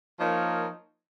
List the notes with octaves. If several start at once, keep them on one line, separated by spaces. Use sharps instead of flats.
F3 A#3 D#4 A#4 C#5